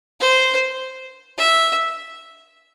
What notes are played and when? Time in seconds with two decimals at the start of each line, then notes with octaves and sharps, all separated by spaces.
0.20 C5
1.38 E5